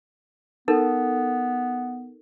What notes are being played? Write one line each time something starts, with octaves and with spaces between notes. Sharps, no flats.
B3 D#4 A4 A#4